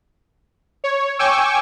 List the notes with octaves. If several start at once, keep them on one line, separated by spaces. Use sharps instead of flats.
C#5
G5 G#5 C#6 D6 E6